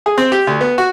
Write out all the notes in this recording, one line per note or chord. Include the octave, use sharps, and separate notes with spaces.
G#4
C4
G4
D2
B3
F#4